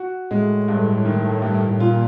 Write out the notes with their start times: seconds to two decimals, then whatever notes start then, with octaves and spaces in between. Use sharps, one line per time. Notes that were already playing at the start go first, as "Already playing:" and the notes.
Already playing: F#4
0.31 A2 G#3
0.68 G2
1.05 D#3
1.42 G2
1.69 A2
1.80 A#2 F4